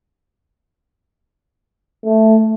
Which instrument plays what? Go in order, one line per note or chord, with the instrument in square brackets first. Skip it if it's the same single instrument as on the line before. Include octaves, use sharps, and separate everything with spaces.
[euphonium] A3